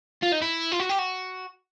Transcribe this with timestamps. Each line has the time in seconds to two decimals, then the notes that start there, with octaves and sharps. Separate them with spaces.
0.23 F4
0.32 D#4
0.42 E4
0.72 F4
0.80 F#4
0.89 G4
0.99 F#4